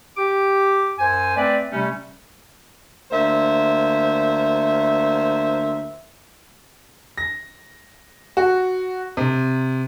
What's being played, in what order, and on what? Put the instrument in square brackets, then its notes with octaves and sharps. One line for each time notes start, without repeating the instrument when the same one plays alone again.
[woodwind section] G4 D6
F#2 C5 G#5
A3 C4 B4 D5
C3 G3 A3 C#4
[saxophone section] D2 A#3 C5 E5
[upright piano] A#6
F#4
C3